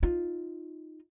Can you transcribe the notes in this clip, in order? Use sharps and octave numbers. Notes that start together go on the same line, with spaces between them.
D#4 F4